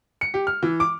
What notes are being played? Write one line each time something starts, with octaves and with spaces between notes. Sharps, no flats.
C#7
G4
F6
E3
D6